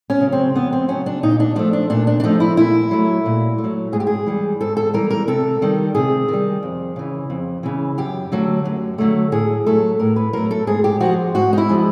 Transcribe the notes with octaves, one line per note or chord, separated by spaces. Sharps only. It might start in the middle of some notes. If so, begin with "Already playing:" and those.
C#4
C#3 F#3
C4
F2 B3
C4
C#3 F#3 C#4
D4
A#2 D#4
D4
F3 A3 D4
D4
A#2 D4
D4
D4
F3 A3 D#4
E4
A#2 E4
F#3 A3
A#2
A3
F#3
G#2 G#4
G4
G#4
E3 G3
G#2 A4
A4
E3 G3 A#4
A#4
C3 A4
D#3 G3
C3 G#4
D#3 G3
F2
C#3 E3
F2
C#3 E3
F#2 G4
D3 F#3 A3
F#2
D3 F#3 A3
A2 G#4
F#3 A3 A4
A2 A#4
B4
F#3 A3 A#4
A4
G#2 G#4
G4
F3 G#3 F#4
G#2 F#4
D#4
E4
F3 G#3